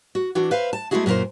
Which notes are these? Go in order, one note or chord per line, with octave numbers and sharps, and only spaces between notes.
F#4
E3 D4 F#4
B4 C5 E5 F5
A5
G#3 A3 B3 E4 F#4 G#4
F#2 A#2 D4 A#4 C5